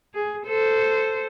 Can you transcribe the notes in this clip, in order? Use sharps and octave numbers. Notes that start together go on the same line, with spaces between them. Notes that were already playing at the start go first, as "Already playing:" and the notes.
G#4
A4 C5